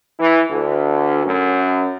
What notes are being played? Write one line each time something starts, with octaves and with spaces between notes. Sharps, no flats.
E3
D2
F#2